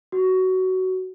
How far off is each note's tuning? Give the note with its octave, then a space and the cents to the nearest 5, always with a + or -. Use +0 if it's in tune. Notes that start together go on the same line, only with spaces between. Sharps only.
F#4 +15